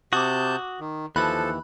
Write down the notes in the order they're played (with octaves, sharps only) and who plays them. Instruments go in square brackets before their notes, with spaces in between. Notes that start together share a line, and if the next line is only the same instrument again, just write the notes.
[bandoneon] C3 A5 G6 [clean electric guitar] F#4 [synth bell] D6 D#6
[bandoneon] D#3
[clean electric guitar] D#2 E3 [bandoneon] F3 A4 [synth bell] B5 F#6